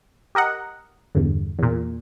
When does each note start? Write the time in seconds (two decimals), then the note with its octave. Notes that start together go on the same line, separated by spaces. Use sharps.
0.35 G4 A#4 D#5 F#5
1.15 E2 G2 D3
1.59 E2 A#2